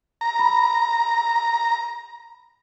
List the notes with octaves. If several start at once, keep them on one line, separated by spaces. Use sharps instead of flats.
A#5
B5